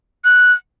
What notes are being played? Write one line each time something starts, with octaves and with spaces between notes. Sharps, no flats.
F#6